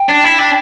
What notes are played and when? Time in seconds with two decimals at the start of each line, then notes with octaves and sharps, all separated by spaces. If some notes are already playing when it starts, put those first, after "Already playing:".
Already playing: G5
0.09 D4
0.24 E4
0.39 D4